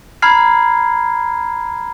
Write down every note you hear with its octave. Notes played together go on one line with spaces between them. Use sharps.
A#5 B5 F6 G#6 C7